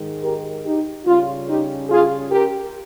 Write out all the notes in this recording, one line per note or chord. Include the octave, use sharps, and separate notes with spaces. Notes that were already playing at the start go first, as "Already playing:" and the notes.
Already playing: G#2 D#3 G#3
G4 A#4
D#4 G4
C#3 G3 C#4 F4
D#4 G4
F4 G#4
G4 A#4